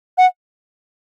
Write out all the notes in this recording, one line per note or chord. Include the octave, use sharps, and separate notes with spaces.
F#5